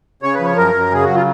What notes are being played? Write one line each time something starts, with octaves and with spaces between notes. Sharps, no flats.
C#3 C#5
B4
F3
C#5
F#2 A#4
F#2
C#3 G#4
F#4
F#3
F4